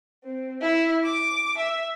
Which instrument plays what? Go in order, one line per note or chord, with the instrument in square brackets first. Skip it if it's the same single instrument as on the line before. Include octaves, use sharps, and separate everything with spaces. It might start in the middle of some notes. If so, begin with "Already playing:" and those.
[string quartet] C4
E4
D6
E5